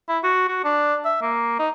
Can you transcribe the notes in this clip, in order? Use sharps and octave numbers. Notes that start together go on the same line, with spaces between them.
E4
F#4
F#4
D4
E5
A#3
D#4